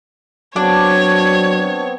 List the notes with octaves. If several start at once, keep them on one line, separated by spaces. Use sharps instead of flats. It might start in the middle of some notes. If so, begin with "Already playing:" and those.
F#3 B3 C4 D4 C#5